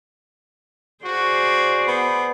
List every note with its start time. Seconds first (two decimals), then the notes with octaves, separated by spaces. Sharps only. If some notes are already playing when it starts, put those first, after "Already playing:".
1.05 F#4 G#4 C5 D5
1.88 B3